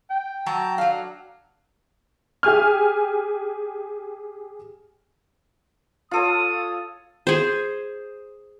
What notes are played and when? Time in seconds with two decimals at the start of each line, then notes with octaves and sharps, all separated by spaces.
0.10 G5
0.46 F#3 A5 A#5
0.78 F#3 D4 F5
2.43 G4 G#4 G#5 F6
6.11 F4 A4 C#5 D#6
7.27 G#4 C5